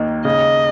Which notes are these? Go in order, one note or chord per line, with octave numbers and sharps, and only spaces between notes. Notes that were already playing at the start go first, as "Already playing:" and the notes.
Already playing: D#2 A#3 D#4
C#3 D#5